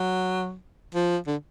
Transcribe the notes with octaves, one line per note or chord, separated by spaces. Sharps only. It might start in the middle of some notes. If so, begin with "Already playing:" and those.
Already playing: F#3
F3
D3